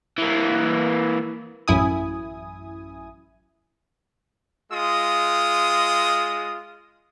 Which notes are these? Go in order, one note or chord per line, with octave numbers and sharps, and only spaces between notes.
E3 A#3
A1 F#2 E4 G#5 D#6
G#3 F4 D#6